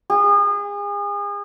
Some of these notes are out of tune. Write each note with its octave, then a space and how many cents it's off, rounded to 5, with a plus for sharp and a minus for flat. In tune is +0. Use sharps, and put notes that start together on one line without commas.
G#4 -35